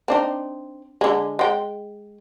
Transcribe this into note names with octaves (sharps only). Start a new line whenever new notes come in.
C4 D4 D#4
D3 G#3
G#3 G5